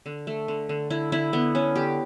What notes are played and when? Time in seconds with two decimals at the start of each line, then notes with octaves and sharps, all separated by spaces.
0.06 D3
0.27 A3
0.48 D3
0.69 D3
0.90 D3 E4
1.12 D3 E4
1.33 D3 B3
1.55 D3 C#4
1.76 D3 G4